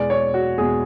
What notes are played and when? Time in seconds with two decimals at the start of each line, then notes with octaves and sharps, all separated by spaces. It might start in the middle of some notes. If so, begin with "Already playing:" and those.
Already playing: E2 B2 G#3 D5
0.10 C#5
0.34 F#4
0.58 E2 B2 G#3 G#4